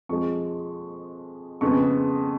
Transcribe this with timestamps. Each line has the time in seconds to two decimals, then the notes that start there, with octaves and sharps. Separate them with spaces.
0.09 F2 F3 G#3 C#6
1.61 F2 C#3 G#3 B3 C#6